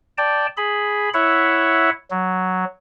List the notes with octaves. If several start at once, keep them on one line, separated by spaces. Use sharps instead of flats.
D5 G5 A5
G#4 B5
E4 C#5 E5 F#5
F#3